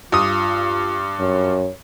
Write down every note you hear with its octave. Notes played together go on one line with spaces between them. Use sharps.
G2 F4 D6 D#6
F#2 C#5